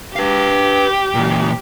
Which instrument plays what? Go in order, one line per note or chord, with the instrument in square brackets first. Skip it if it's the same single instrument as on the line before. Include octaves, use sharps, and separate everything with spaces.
[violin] G4 [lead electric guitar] B4 F5
[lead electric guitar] A#2 E3